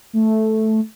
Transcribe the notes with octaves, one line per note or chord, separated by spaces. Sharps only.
A3